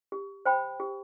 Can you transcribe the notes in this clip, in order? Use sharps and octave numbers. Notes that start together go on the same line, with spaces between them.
G4
C5 G5 B5
G4